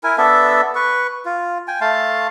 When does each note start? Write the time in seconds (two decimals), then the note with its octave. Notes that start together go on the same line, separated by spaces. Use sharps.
0.04 E4 A#4 G#5
0.18 B3 D4 A4 E5
0.75 B4 C#6
1.25 F4
1.68 G5 G#5
1.81 A3 F5 A5 C6